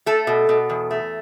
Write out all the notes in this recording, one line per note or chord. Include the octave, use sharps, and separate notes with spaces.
A3 A4
B2
B2
E2
A3